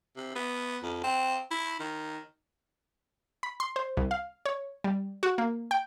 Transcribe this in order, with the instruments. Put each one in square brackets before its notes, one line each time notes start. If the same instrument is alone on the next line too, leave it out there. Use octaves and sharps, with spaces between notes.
[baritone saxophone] C3
B3
F2
C4
E4
D#3
[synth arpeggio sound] B5
C6
C5
C2
F5
C#5
G3
F#4
A#3
G5